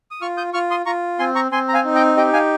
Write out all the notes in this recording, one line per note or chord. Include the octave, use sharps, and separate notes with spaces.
D#6
F4 C#6 F6
D#6 G6
F4 C#6 F6
C6 D#6
F4 A#5 C#6
C4 G#5 C6
A#5 C#6
C4 G#5 C6
A#5
F5 G#5
D#4
D#5 G5
G4 D#5 G5
F5 G#5